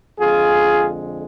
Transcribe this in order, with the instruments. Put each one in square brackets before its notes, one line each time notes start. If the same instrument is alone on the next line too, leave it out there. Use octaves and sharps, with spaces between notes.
[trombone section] F2 D3 G#3 F4 G#4